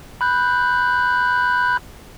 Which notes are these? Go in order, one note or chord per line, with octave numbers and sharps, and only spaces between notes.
B5 F#6 G6